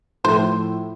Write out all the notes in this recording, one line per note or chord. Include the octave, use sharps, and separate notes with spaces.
A2 F3 A3 E4 C5